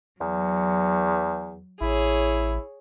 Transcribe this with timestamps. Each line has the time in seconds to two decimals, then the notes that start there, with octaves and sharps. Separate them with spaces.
0.20 E2 F#3
1.81 A1 E4 G#4 C#5